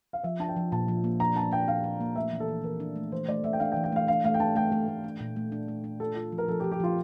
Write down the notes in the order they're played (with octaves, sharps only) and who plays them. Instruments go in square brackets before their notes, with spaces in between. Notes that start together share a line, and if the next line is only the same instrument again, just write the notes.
[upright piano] F5
[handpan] F3 [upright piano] E5
[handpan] D4 [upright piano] A5
[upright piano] G5
[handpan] F3
[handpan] A#2 [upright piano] A5
[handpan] F3
A#3
[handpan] D4 [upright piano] A#5
[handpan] D4 [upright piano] A5
[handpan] D4 [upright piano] G5
[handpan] D4 [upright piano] F5
[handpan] D4
A#3
[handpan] A3 [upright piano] E5
[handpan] E3
[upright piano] A4
[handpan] E3
[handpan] E3 [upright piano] A#4
[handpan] D4
A3
[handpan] E3 [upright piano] C5
[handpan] A3 [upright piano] D5
[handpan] A3 [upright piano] E5
[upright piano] G5
[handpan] D4 [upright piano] F5
[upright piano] G5
[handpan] E3
[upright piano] G5
[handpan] A3 [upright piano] F5
[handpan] D4 [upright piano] F5
[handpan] A3 [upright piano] F5
[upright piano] G5
[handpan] D4 [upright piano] A5
[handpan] A3 [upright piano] G5
[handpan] A3
A3
D4
A#2
A3
D4
A3
D4
[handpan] F4 [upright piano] A4
[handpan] F4
F3
[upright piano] A#4
[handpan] F3 [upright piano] A4
[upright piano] G4
[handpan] F3
[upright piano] G4
[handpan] F3 [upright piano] F4